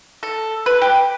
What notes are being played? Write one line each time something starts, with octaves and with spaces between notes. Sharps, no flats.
A4
B4
G4